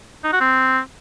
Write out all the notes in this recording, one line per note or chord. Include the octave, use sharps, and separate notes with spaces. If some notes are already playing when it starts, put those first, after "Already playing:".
D#4
F#4
C4